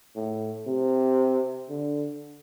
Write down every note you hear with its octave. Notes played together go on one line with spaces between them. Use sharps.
A2
C3
D3